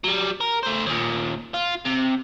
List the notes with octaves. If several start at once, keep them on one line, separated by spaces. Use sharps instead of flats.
F#3 G3
A#4
A3 C5
D#2 A#2
F4
C3